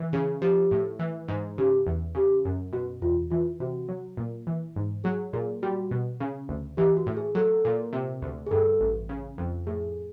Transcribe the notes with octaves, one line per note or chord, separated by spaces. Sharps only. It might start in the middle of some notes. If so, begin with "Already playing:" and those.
Already playing: E3
C#3 G#4
F3 G4
A2
E3
G#2
C#3 G4
E2
C#3 G4
F#2
B2 F#4
E2 F4
E3 F4
C3 F#4
F#3
A#2
E3
G#2
F#3 G#4
A#2 G#4
G3 F#4
B2
C#3
D2
E3 G4
F#4
A2
G#4
F#3 A4
A#2
C3
D2
G#4
G2 A4
A1
C#3
F2
A2 G#4